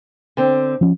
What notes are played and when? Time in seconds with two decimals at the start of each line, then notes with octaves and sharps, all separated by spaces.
0.37 D3 C4
0.81 F3 C#4